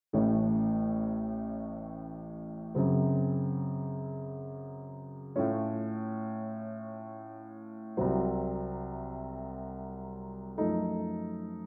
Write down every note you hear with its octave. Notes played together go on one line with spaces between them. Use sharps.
A1 A2 A3 C#4
F#2 C#3 F#3 C4
A2 A3 C#4 F4
C2 C3 F#3 C4
F#2 F3 A3 D#4 A4